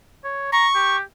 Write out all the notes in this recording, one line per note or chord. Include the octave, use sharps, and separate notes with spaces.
C#5
A#5 C#6
G4